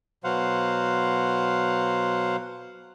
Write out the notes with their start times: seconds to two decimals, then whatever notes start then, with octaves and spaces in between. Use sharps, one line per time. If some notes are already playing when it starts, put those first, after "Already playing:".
0.24 B2 F#3 C5 F5 F#5